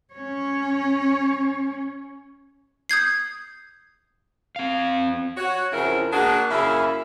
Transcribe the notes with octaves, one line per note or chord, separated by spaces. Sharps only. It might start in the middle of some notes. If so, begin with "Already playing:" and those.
C#4 C#5
D#6 G6 G#6 C7
C4 F5
F#4 C#5
F2 C#3 F3 F#3 E4 A#4
A#3 D4 F#4 G#4 A#4
F#2 C#3 A#3 E4 E5 F5